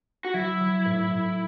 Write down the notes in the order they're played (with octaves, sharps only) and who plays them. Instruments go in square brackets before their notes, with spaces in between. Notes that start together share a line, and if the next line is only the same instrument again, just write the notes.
[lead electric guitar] F#4
[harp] F#3 [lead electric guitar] E4
[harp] F#3
A2
A2